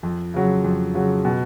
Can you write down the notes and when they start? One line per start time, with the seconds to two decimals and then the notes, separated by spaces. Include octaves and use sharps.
0.03 F2
0.34 C#3 F#3
0.64 F2
0.94 C#3 F#3
1.25 B2